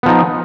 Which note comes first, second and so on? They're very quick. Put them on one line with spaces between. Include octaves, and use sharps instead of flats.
B3 F3 D#4